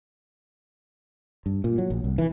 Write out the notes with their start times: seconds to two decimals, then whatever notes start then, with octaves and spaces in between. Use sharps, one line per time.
1.46 G2
1.64 A#2
1.78 F#3
1.90 A#1
2.04 C2
2.18 E3